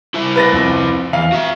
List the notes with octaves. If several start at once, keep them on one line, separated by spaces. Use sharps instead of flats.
E4 C5 E5
B4 A6 A#6
F2
E2 F5
F#4 E5